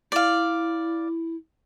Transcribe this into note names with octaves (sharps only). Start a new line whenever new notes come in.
E4 D5 F5